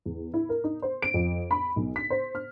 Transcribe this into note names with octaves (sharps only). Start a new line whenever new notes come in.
E2
E4
A#4
D#4
C5
D7
F2
B5
B1
B6
C5
F6